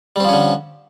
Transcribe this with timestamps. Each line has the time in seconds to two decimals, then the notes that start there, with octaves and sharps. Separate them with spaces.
0.16 G3
0.20 C4
0.25 F3
0.29 C#4
0.33 D3